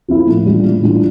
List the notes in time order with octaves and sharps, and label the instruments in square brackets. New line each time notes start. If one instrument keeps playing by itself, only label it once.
[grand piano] F3 C4 E4
A2
E3 G3 D4 F4
A2
E3 G3 D4 F4